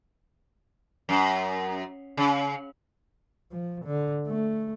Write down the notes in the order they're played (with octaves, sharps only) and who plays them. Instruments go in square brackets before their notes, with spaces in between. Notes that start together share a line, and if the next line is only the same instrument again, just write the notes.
[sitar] F#2
C#3
[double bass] F3
D3
A3